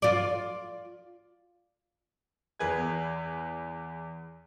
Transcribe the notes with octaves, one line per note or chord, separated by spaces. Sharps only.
F4 D5
E2 G#4 B4 G#5 G#6